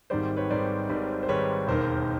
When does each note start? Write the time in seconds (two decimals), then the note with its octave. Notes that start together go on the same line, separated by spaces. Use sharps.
0.10 G#1 G#2 D#3 G3 C5 D5
0.36 B4 C#5
0.50 G#1 G#2 D#3 G3 C5 D5
0.89 G#1 G#2 D#3 G3
1.23 C5
1.28 G#1 G#2 D#3 G3 B4 C#5
1.68 E1 D#2 D#3 A#4 C5